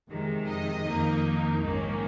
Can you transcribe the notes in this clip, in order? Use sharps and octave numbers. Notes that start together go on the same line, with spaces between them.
F2 C3 D#3 G#3
D#5
F2 D#3 A#3 D#4
A#1 G#2 D#3 A#3 C#4